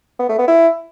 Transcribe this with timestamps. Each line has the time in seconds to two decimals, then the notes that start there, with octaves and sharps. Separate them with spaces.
0.19 B3
0.29 A3
0.38 B3
0.48 E4